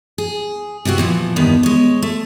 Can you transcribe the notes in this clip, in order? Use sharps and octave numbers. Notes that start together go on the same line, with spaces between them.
G#4
C3 B3 C4 F#4
A#2 E3 F3
E2 G2 D#3 B3
G#3 C#5
A3